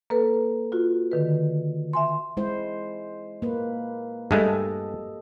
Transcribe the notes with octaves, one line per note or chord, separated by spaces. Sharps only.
A#3 A4 B4
F4 F#4
D3 D#3 B4
E5 G#5 C6
G#3 E4 C5
A#3 B4
G2 G#3 A3 G4 A4 D#5